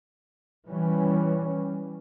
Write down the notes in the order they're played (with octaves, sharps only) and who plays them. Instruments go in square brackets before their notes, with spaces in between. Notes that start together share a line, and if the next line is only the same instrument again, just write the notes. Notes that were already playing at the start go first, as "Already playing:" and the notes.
[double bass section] E3 G3 C#4